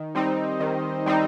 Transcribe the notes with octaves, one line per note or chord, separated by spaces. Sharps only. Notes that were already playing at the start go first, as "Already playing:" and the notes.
Already playing: D#3
G3 C4 D#4
D#3
G3 C4 D#4